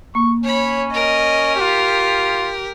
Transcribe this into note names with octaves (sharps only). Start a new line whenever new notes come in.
A#3 C#6
C#4 C#5 B5
A#4 D#5
F4 G4